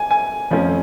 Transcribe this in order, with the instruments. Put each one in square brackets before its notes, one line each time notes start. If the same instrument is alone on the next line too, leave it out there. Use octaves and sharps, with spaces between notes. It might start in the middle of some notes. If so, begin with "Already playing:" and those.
Already playing: [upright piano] G#5
G#5
[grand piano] F2 F3 A3 C#4